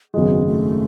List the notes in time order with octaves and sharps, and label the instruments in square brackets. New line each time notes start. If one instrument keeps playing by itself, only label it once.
[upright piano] G#1 F#2 C#3 G#3 [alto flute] B3
[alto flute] A3